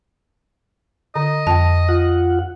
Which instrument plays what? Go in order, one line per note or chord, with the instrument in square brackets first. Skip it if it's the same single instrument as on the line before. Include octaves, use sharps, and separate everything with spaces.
[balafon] D3 [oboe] D#5
[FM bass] F2 [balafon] G5 A5
[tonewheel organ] F4 F#5